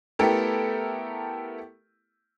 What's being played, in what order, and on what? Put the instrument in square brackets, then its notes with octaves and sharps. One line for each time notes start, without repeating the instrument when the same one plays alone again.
[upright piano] A3 B3 E4 G4 A4 A#4